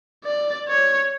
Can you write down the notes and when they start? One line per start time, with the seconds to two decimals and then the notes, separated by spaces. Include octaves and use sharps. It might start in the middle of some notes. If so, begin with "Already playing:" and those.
0.25 D5
0.68 C#5